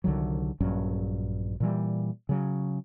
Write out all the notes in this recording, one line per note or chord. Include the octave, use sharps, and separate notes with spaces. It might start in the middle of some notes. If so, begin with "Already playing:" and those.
C2 D3 D#3 F#3
A#1 G2 F#3 C#4
A#2 E3 G3
C#3 F#3